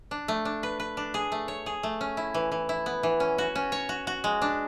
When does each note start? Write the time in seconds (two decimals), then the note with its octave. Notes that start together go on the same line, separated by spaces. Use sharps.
0.11 D4
0.28 A3
0.45 D4
0.63 B4
0.80 B4
0.97 D4
1.14 G#4
1.32 A3
1.48 C#5
1.66 G#4
1.83 A3
2.01 C#4
2.17 E4
2.34 E3
2.52 E3
2.69 E4
2.86 B3
3.03 E3
3.20 C#4
3.38 F#4
3.55 C#4
3.72 C#5
3.89 F#4
4.07 F#4
4.24 G#3
4.42 D4